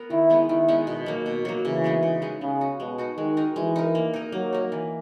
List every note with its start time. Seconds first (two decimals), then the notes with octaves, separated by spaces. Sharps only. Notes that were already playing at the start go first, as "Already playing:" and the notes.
Already playing: B3 A#4
0.10 D#3 E4
0.30 G#3 B3 D#4
0.49 D#3 E4
0.68 G#3 B3 D#4
0.87 B2
1.06 F#3 A#3
1.26 B2
1.45 F#3 A#3
1.65 C#3 E3
1.84 G#3 B3 D#4
2.03 C#3
2.22 G#3 B3 D#4
2.41 C#3 G#3
2.61 D#4 F#4
2.80 B2 G#3
2.98 D#4 F#4
3.18 D#3 G#3
3.37 D#4 A#4
3.56 E3 G#3
3.76 D#4 A#4
3.95 A#3
4.14 D#4 A#4
4.32 F#3 A#3
4.53 D#4 A#4
4.72 E3